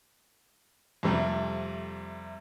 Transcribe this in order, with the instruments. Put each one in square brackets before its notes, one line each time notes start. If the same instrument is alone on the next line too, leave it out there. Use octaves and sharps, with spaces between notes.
[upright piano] F2 C3 G3 A3